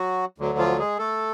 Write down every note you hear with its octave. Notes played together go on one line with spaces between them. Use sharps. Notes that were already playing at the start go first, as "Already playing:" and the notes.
Already playing: F#3 F#4
D2 D3 F#3
F3 F4
G#3 G#4
A3 A4